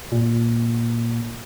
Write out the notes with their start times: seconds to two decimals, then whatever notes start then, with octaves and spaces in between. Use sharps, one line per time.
0.12 A#2